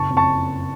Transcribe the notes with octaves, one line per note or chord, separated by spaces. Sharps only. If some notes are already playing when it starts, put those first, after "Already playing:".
Already playing: F#1 A5 C#6
F2
A5 C#6